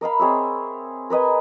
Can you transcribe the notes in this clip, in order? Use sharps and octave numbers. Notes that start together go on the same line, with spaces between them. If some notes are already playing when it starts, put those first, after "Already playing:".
A#4 D#5 F5 B5
C4 G#4 C#5 E5
A#4 B4 D#5 G#5